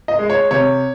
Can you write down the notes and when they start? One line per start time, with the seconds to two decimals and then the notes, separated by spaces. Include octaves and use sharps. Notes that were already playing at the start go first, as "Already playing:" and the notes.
0.08 D#5
0.19 G#3
0.30 C#5
0.51 C3 C#5